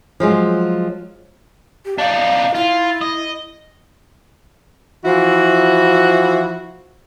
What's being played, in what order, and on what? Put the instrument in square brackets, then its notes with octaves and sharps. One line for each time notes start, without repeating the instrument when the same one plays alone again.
[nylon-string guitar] F3 F#3 G#3
[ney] G4
[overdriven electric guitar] D4 D#4 [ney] F5
[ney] E4 [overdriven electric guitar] F4
[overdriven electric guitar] D#5
[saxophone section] E3 F3 E4 F#4